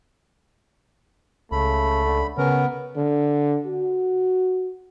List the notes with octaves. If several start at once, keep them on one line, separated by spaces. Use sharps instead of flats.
C#2 C#3 A3 B5
D3
C#3 B3 C#4 A#4
D3
F#4